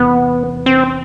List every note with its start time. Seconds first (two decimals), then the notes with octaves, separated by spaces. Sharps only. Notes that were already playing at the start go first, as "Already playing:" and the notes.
Already playing: E2 C3 E3 B3
0.66 C4